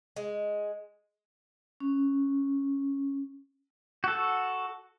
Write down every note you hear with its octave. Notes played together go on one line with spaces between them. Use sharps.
G#3
C#4
F#4 A4